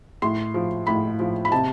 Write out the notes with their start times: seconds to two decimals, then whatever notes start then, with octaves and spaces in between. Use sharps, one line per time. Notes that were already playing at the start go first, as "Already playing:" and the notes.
0.22 A2 C6
0.54 F3
0.87 A2 B5
1.19 F3
1.45 B5
1.52 C3 A5